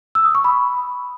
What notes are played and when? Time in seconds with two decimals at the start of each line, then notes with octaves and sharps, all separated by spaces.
0.15 E6
0.25 D#6
0.35 C#6
0.44 B5